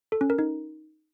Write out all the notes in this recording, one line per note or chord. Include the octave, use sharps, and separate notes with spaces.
A4
C#4
A#4
D#4